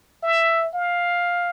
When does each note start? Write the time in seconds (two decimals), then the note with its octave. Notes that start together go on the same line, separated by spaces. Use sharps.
0.23 E5
0.74 F5